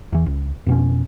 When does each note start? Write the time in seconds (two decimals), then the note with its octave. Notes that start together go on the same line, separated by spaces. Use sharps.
0.12 E2 E3
0.26 C#2
0.66 F2 B2 C#4